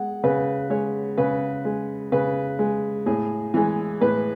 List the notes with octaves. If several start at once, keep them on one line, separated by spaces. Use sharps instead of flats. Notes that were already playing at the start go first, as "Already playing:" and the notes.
Already playing: G#3 F#5
C#3 B4
G#3 C#5
C#3 B4
G#3
C#3 B4
G#3
A2 G#4
E3 G#3
A2 B4